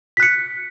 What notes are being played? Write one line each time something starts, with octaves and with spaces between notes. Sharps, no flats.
F#6 B6 C#7